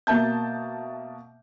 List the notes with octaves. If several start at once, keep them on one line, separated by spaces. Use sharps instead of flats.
B2 A#3 E5 A5 G6